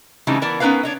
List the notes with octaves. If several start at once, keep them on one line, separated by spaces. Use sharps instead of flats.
C#3 E3 G3 A3 C4 D#4
E3 B3 A#4 D5 A5
B3 C#4 D#4 A#4 B4 F5
D4 C#5 D#5